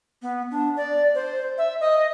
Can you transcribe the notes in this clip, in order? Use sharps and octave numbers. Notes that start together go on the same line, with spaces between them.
B3
D4
D5
C5
E5
D#5